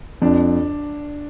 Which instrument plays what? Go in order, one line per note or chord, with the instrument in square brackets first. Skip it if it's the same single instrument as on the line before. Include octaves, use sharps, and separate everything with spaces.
[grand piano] F2 [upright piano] D4